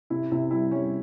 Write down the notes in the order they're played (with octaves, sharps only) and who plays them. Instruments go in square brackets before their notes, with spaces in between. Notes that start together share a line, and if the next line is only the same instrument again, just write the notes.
[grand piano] C3 E4
C3 E4
G3 E4
G3 C#4